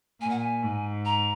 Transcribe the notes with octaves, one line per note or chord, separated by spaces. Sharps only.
A#2 G#5
F#5
G#5
G#2
A#5